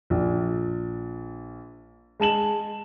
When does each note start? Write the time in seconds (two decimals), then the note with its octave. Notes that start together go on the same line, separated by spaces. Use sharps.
0.10 A#1
2.20 G#3 A5 E7 F#7